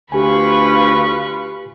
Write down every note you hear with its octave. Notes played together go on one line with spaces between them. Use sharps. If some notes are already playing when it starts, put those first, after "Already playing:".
D2 F4 G4 B4 G#5 B5 C#6